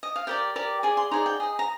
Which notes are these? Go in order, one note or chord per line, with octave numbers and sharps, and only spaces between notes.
D#5
F5
G4 A#4 D5 G5
G4 A#4 D5
G#4 D5 G#5
C6
D#4 G#4 D5 A#5
G5
G#4 D#5
A#5